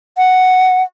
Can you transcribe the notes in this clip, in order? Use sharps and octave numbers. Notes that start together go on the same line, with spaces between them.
F#5